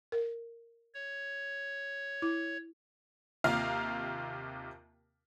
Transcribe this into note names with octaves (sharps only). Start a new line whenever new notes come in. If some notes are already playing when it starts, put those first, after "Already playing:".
A#4
C#5
E4
D#2 C3 F4 F5 A#5